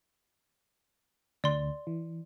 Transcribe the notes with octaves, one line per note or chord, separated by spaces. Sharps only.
D2 D5 C6
E3